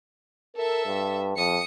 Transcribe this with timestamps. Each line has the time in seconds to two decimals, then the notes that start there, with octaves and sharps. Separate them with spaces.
0.56 A4 A#4 E5
0.86 G2
1.36 F2 D#6 C#7